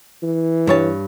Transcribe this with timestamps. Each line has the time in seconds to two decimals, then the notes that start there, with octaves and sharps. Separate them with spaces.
0.23 E3
0.67 G2 C#5 A5